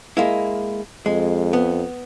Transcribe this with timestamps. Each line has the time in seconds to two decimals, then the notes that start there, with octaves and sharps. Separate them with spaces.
0.17 G#3 A#3 E4
1.06 F2 G#3
1.53 B3